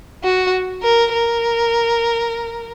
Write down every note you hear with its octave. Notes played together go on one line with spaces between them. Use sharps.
F#4
A#4
A#4